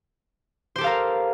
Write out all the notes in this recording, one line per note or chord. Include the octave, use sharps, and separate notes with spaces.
G4 A4 A#4 C5 F5